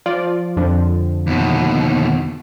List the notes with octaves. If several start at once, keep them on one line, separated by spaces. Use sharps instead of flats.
F3 F4 D5
F2 D3 F3
D#2 B2